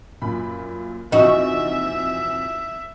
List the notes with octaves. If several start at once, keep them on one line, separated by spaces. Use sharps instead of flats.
F#2 A#2 B5
A#1 E2 C3 D#4 F#4 E5